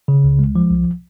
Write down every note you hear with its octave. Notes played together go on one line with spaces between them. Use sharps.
C#3
C#2
G#3
F3
C2